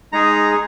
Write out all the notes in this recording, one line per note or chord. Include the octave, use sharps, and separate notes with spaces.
G#3 D#4 G#4 A#5